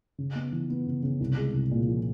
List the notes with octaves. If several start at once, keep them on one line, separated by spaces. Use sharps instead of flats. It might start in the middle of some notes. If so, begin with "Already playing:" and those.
C#3
B3
E3
B3
C#3
C#3
C2
G#3
C2
A#2
F3